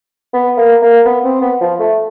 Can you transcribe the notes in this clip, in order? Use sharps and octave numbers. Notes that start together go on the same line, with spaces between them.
B3
A#3
A#3
B3
C4
B3
F3
A3